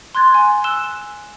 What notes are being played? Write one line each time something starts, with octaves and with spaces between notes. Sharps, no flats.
C6 F#6 G#6 A6
G#5
E6 F#6 E7 G7